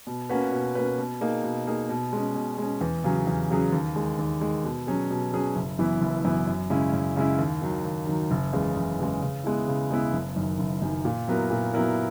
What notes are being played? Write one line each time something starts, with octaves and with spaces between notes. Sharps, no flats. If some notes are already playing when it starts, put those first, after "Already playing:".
B2
A#3 C#4 F#4 B4
B2
A#3 C#4 F#4 B4
B2
A#3 D#4 G#4
B2
A#3 D#4 G#4
B2
G#3 C#4
B2
G#3 C#4
E2
C#3 F#3 C#4 G#4
E2
C#3 F#3 C#4 G#4
D#2
D#3 G#3
D#2
D#3 G#3
B2
F#3 C#4 G#4
B2
F#3 C#4 G#4
F#1
F#2 E3 B3 E4
F#1
F#2 E3 B3 E4
F#2
C#3 G#3 C#4 E4
F#2
C#3 G#3 C#4 E4
D#2
D#3 F#3
D#2
D#3 F#3
F#1
E2 C#3 G#3
F#1
E2 C#3 G#3
C#3
G#3 B3 E4
C#3
G#3 B3 E4
F#1
F#2 D#3
F#1
F#2 D#3
A#2
F#3 B3 E4 A#4
A#2
F#3 B3 E4 A#4